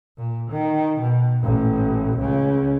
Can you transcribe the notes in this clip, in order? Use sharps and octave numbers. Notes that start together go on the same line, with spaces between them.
A#2
D#3
B2
A1 A#2
C#2 C#3